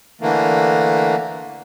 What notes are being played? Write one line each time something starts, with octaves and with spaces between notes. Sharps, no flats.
D3 E3 A3 A#3